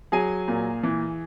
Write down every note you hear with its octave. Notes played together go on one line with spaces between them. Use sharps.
F#3 G#4 G#5
A#2
E3